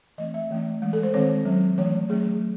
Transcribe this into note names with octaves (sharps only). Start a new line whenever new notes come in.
E3 A3 C4 D#5
E5
E3 A3 C#4
E3 G#3 C#4
A4
C5
D#3 G#3 C4 C#5
F#3 C#4
E3 A3 C#4 C#5
F#3 A3 C#4 G#4
F#3